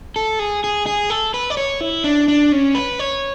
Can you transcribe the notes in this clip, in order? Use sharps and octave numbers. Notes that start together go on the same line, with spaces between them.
A4
G#4
G#4
G#4
A4
B4
D5
C#5
E4
D4
D4
C#4
B4
C#5